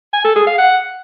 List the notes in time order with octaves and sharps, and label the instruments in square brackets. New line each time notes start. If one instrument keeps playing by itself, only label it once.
[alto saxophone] G#5
A4
G#4
F5
F#5